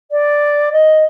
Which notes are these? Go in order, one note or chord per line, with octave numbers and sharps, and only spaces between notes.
D5
D#5